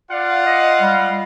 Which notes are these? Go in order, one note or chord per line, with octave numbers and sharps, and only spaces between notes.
F4 D5 F5 F#5
D#5
G3